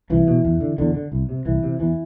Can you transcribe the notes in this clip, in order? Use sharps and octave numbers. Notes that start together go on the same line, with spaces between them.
C2 E3
B2
E2
D3
E2 D3
D3
C2
C3
C2 E3
C3
E2 E3